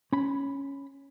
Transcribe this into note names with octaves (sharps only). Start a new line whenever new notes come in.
C#4 B5